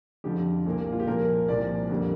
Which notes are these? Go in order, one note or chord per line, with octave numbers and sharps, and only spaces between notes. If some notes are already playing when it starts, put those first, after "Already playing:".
F2 D3 F3 G4
C2 A#2 A#3
F4
G4
A#2 F3 A#3 A#4
C2 A#2 F3 D5
F2 D3 G3 A#3